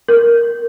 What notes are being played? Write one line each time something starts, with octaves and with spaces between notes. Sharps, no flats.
A#4